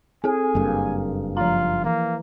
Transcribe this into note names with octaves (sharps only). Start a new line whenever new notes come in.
C4 G#4 A4 G#5
F#1 G2 A#3
F3 F4 A#5
E3 A#3